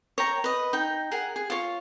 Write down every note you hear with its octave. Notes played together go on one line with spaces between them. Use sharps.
C#5 G5 A#5
B4 D#5
D#4 G5
G#4 A#4 F#5
G#4
F4 C#5